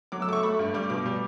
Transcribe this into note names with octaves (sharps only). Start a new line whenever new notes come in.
F#3 D6
E6
A3 D6
C#6
A3 B5
G2
G3 D6
B2 D6
G3